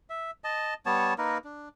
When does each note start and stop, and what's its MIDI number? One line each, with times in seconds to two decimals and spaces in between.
0.10 0.31 76
0.44 0.74 75
0.44 0.74 81
0.86 1.14 55
0.86 1.14 59
0.86 1.14 73
0.86 1.14 81
1.18 1.38 58
1.18 1.38 63
1.18 1.38 70
1.18 1.38 71
1.44 1.69 62